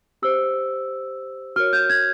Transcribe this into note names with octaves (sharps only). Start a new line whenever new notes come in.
G4 C5 E6
F#4 A#4 C#5 F6
G6
G#6